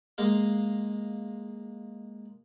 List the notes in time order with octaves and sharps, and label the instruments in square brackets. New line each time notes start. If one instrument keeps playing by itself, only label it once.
[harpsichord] G#3 A#3 F5